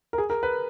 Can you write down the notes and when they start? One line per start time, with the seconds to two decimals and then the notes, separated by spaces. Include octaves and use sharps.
0.13 A#4
0.18 G#4
0.30 A#4
0.43 B4